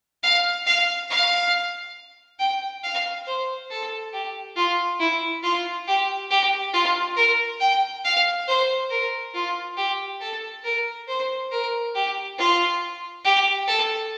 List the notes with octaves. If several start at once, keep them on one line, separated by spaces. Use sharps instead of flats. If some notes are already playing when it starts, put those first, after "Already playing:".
F5
F5
F5
G5
F5
C5
A4
G4
F4
E4
F4
G4
G4
F4
A#4
G5
F5
C5
A#4
F4
G4
A4
A#4
C5
A#4
G4
F4
G4
A4